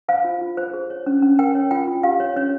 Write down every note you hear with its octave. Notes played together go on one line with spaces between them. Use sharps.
C5 F5
F4
F4
C5
G#4
C#5
C#4
C#4
A#4 G5
C#5
F4 G5
F4
G4 F5
C#5
C#4 C#5